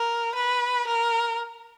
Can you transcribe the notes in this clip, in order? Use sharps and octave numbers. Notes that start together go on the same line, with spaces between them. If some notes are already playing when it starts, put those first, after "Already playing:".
Already playing: A#4
B4
A#4